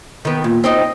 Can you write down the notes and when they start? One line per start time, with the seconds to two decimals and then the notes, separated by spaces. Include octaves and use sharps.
0.25 D#3 B3
0.44 A#2
0.64 C4 D#4 D#5